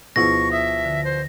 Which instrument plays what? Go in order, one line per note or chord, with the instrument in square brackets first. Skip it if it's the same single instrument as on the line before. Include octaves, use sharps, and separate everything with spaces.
[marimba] D2 E4 G#4 [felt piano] B2 F3 [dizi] C#6 [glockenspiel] A#6
[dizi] E5 [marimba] D#6
[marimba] D3
[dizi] C5